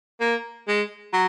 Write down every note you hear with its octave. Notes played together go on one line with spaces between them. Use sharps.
A#3
G#3
F#3